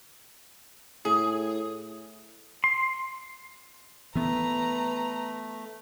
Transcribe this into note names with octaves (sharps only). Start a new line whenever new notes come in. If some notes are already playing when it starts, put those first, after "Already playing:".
A2 G#4
C6
E3 A3 B3 B4 A#5